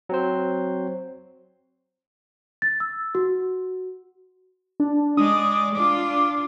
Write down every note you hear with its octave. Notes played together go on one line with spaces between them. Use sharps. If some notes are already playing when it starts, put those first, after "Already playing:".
F#3 C4 C5
A6
E6
F#4
D4
G#3 D5 D#6
D4 F4 D6